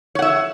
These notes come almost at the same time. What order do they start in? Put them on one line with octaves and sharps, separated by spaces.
C#5 F#5 E5